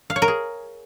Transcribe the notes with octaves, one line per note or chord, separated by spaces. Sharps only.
F5
C#5
A#4
G#4